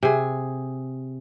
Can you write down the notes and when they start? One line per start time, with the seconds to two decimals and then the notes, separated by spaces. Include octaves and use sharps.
0.03 C3 G#4